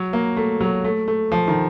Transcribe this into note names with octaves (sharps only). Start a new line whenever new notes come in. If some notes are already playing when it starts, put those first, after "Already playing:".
Already playing: F#3
A#3
A3
F#3
A3
A3
F3
D#3